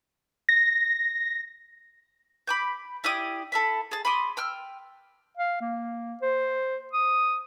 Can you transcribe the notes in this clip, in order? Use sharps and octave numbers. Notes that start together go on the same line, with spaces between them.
A#6
B5 D6 G6
E4 G4 D5 D#6
A4 E5 B5
G#4 A5
B5 C6 D6 D#6
G5 E6 F6
F5
A#3
C5
D#6